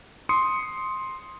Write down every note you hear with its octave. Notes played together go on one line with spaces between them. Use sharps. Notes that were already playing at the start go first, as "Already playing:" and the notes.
C6 D#6 C#7